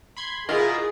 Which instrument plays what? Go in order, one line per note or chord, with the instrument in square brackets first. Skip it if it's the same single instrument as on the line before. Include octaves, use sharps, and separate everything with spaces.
[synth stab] B5 C6 G#6
[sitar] B2 E4 [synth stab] F4 [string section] G#4 [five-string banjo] A#4